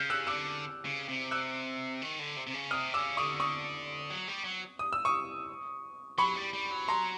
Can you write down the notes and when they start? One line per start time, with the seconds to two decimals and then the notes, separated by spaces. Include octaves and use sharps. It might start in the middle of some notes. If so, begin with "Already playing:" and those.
Already playing: C#3 F6 G6
0.10 E6 F#6
0.27 D3 D6 E6
0.85 C#3
1.08 C3
1.31 E6 F#6
2.02 D#3
2.19 D3
2.36 C3
2.47 C3
2.54 C#3
2.71 C3 D#6 F6
2.94 C#3 D6 E6
3.17 D3 C#6 D#6
3.40 C#6 D#6
4.10 F#3
4.28 G3
4.44 F#3
4.79 D#6
4.93 E6
5.05 C#6 D#6
6.18 F#3 B5 C#6
6.36 G3
6.53 G3
6.71 F#3
6.88 A#5 C6